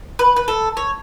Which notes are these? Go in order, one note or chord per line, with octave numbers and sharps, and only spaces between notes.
B4
B4
A4
C#5